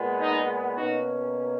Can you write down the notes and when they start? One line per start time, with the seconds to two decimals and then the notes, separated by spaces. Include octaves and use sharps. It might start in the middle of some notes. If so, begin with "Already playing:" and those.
Already playing: A#2 G#3 B3
0.18 D#4
0.76 B2 A#3 C#4 D#4 F#4